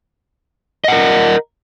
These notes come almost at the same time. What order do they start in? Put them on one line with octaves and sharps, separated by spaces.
D#5 F#5 A#4